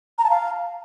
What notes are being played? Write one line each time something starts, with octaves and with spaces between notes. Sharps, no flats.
A#5
A5
F5